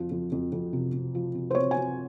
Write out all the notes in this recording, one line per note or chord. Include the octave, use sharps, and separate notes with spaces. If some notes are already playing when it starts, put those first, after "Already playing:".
Already playing: F2 F3
F2
F2
F2
C3
C3
F3
C3
C5
C4 C#5
G#5
C4